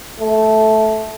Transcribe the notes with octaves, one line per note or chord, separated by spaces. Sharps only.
A3